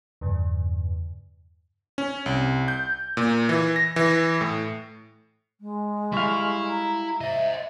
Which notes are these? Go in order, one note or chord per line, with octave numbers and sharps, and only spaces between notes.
E2 G2 C#3
C#4
C2
G6
A#2
E3
A#6
E3
A2
G#3
G3 E4 F5 C#6
A#5
C5 D#5 E5